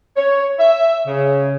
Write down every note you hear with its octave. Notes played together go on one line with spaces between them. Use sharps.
C#5
E5
C#3